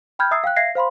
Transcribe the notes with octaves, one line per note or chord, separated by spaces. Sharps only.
G5 B5 F6 G6 G#6
E5 A#5 D#6 E6 G#6 C7
F5 G5 F#6
E5 F5 G#6 A#6 C7
C5 F5 B5 C6